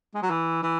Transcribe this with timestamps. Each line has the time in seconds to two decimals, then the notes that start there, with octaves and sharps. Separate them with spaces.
0.14 G#3
0.22 F#3
0.30 E3
0.63 E3